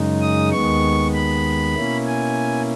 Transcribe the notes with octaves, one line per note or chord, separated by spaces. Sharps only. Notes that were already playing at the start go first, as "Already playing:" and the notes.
Already playing: F#2 C#3 G#3 D#4
D#6
D#2 D#3 G#3 B3 C#6
B5
B2 A#3 C#4 E4
G#5